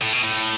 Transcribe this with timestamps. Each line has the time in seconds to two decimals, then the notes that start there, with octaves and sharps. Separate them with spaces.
0.02 A2
0.13 B2
0.24 A2